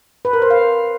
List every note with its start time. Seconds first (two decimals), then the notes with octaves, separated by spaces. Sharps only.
0.25 B4
0.33 A#4
0.42 C5
0.50 F5